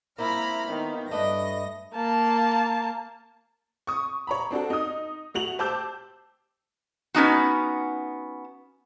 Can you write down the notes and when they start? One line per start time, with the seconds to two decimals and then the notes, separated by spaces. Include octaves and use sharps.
0.18 A#3 C4 E4 F4 A#5 B5 F6
0.68 D#3 B3
1.11 G2 A3 D4 B4 D#5 A#6
1.95 A#3 A5
3.87 C#6 D#6
4.27 C#5 A#5 B5
4.51 C4 D4 F#4 A4
4.70 D#4 D#6
5.34 A3 F#4 F7 F#7
5.59 G4 C5 A5 D6 E6 G6
7.15 B3 C#4 D#4 F#4